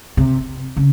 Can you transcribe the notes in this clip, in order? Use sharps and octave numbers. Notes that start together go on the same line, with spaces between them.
C3
C#3